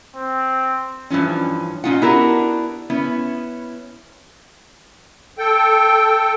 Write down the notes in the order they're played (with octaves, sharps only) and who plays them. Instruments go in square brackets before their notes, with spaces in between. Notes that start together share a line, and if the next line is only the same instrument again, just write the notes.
[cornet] C4
[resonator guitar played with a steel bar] G2 E3 F3 C#4
A#2 C#4 D#4 F4 F#5
B3 D4 E4 F#4 G4 A#4
B3 C#4 E4
[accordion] A4 G5